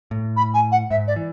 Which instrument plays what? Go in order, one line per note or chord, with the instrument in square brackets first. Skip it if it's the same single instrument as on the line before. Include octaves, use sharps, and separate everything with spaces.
[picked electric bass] A2
[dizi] B5
G#5
F#5
[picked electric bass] G#2 [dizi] E5
[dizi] D5
[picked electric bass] E3